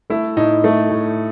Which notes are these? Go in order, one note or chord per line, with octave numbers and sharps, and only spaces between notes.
A3 E4
A2 D#4
A3
A2